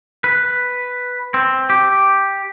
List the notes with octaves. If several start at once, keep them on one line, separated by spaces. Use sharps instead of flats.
B4
C4
G4